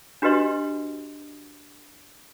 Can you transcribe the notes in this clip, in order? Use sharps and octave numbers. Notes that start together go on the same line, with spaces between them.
D4 F#4 G4 B4 D#5 C6